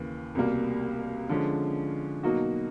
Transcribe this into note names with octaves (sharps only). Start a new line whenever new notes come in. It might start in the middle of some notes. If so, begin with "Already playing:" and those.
Already playing: D#2 C#3 E3
C2 B2 G3 A#3
D3 F3 G#3 C#4
B2 F#3 A#3 D#4 F#4